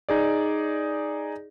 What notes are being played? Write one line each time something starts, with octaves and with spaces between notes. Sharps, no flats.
D#4 G#4 D5